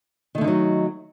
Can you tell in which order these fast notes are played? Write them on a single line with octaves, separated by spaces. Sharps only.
D#3 A3 D3 D#4 F#3